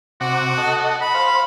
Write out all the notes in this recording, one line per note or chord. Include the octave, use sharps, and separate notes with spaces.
C3 F#4 F#5 D6
A4 D#5 F#5
B5
C5 F5